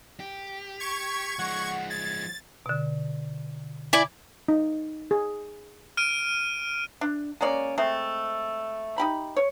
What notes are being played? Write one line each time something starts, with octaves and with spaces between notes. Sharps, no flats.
G4
C#6 G#6
F3 G#3 F#5
G#6 A6
B2 D3
E4 D5 G#5
D#4
G#4
F6 D7 D#7
D4
G#3 A#3 C#4 D5
G#3 A3 C4
D#4 G4 B5
C#5